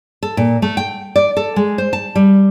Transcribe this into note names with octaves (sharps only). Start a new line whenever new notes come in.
A4
A#2
A3
G5
D5
A4
G#3
C5
A5
G3